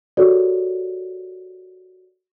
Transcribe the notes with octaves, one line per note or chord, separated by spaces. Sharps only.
F#4 G4 A4 A#4 C#5 D5